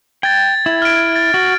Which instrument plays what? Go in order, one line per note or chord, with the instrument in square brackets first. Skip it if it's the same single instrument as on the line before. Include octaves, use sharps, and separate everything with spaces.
[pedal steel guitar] G5 [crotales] G#6 A6
[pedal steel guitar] E4
[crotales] F6 D7
A6
[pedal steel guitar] F#4